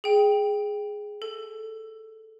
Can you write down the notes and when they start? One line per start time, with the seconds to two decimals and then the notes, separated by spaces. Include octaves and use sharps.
0.04 G#4 G5
1.22 A4